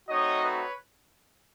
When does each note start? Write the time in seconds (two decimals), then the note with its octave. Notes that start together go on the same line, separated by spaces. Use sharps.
0.09 A3 C4 D#4 F#4 C#5 D#5
0.44 B4 C#5